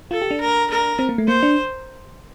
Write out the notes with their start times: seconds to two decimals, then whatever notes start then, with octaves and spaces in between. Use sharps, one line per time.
0.11 F4 A4
0.22 G4
0.31 D4
0.40 A#4
0.70 A#4
0.99 C4
1.09 A#3
1.18 A3
1.28 A#3 C5
1.43 D4